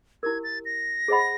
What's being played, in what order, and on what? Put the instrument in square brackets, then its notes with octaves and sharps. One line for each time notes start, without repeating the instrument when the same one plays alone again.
[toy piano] E4 G4 A#4 [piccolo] G#6
[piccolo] A6
A#6
[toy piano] G#4 C5 D#5 F#5 B5